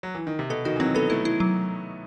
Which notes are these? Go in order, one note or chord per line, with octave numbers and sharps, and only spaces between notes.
F#3
E3
D#3
C3
B2 A4
D#3 F#4
E3
F#3 C4
B3 A4
A3 E4
E4
F#3